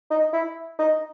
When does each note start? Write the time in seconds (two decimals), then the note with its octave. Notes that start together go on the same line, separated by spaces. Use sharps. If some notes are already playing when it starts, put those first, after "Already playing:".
0.11 D#4
0.33 E4
0.79 D#4